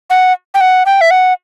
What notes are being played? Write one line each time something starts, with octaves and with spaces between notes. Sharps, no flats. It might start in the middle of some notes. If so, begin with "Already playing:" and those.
F#5
G5
F#5
G5
E5
F#5